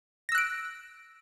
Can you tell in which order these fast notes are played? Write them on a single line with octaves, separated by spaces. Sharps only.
A#6 E6 F#6 D7